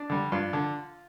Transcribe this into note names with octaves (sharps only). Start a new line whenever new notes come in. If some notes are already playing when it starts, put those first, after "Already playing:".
Already playing: D4
D3 G3
G2 F4
D3